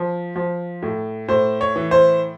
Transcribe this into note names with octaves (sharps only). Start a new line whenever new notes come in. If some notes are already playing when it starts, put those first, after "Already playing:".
Already playing: F3
F3
A2
A2 C5
C#5
E3
C5